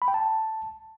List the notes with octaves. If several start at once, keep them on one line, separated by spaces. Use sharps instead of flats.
B5
G5
A5